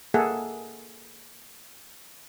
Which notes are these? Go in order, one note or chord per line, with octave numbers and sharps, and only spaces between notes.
A#3 G#4 A4 E5 F#5